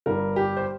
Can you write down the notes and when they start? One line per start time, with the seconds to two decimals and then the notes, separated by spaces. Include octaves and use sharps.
0.06 G1 G2 G3 A#4
0.36 G4
0.57 C5